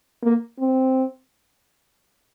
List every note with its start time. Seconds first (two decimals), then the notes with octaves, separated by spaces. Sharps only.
0.23 A#3
0.59 C4